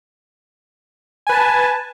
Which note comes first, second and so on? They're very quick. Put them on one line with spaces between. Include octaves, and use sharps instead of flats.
G#5 B4 A5